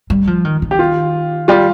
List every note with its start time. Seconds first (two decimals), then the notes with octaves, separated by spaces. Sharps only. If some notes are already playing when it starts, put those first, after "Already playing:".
0.10 G3
0.27 F3
0.45 D#3
0.62 D#3
0.71 G4
0.79 F4
1.48 G3 F4